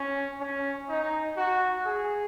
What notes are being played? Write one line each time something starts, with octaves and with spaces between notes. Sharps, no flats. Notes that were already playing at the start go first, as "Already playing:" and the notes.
Already playing: C#4
C#4
D#4
F#4
G#4